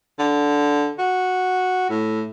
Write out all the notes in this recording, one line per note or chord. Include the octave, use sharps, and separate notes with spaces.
D3
F#4
A2